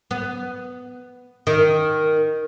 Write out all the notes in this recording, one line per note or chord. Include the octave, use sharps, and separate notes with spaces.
B3
D#3